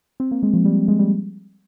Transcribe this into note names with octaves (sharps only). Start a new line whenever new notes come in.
C4
A#3
G#3
F3
G3
G#3
G3